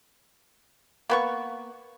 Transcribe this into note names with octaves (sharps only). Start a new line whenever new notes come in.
A#3 B3 C#6